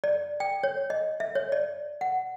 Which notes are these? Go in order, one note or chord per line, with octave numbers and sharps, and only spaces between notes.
D5
G5
C#5
D#5
E5
C#5
D5
F#5